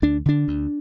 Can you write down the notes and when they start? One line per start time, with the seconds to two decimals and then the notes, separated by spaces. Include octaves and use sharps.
0.02 D2 D4
0.26 D3 D4
0.48 D2